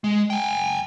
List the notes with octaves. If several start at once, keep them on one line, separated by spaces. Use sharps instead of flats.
G#3
G5 G#5